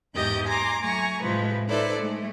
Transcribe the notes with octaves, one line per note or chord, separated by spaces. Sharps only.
E2 G#2 G4 D#5 G6 A6
G#5 A#5 C6 D6
F#3 A3 G#5 A#5 C#6
A2 C3 F3 G#3 B4
D#4 E4 A4 B4 C5 D5
G#3 A3